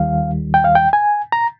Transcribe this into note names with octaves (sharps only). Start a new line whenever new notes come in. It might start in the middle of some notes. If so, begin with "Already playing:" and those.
Already playing: D#2 D#3 G3 F5
G5
F5
G5
G#5
A#5